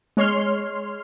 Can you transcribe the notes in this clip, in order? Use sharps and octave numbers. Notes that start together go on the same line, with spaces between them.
G#3 C#5 C6 F6